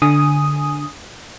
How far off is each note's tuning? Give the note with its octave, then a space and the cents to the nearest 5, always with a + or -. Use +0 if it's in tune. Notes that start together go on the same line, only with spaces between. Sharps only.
D3 +0 G#5 +0 D#6 +0